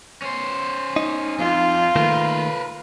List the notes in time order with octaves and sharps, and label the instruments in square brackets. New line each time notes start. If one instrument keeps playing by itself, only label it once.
[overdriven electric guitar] C#4 C5
[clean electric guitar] D#4
[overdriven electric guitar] F2 [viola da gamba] F4
[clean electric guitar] D#3 A3 A#3 [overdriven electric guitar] A#4 B4